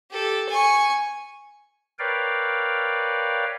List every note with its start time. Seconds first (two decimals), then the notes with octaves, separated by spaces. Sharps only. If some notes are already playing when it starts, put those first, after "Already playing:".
0.11 G4 A4
0.49 G#5 C#6
1.99 A#4 B4 C#5 D5 F5 G5